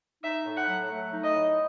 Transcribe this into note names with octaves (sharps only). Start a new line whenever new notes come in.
D#4 E5
A2
F#5
F#3
A3
D#4
D#5
A2